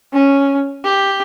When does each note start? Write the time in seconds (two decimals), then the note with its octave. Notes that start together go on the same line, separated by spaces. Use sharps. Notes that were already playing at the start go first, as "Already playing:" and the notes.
0.13 C#4
0.84 G4